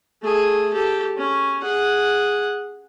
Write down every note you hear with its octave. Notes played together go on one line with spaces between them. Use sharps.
A3 G#4
G4 A4
C#4
G#4 F#5